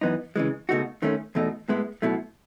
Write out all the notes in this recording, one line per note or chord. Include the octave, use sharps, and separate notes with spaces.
F#2 E3 B3 D#4
C#3 E3 G#3
C#2 B2 A3 D#4 F#4
D#2 D#3 A3 C#4
E2 B2 A3 D#4
A2 G#3 B3 E4
B1 B2 A3 E4